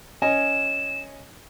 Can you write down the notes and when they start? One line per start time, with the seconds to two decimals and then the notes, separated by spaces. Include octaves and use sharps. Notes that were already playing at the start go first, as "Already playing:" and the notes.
0.22 C#4 D#5 G#5 E7